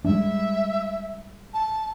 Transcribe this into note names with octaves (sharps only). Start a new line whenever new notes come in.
G3 G#3 D4 E5
A5